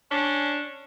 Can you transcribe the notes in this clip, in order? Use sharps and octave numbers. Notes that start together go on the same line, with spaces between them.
C#4 D4